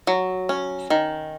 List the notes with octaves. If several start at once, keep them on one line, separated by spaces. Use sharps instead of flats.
F#3
C#4
D#3